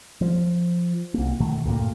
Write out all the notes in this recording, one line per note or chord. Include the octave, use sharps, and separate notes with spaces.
F3
C2 A#3
B2 D#3 E3 A3
D2 G2 A#2 A#3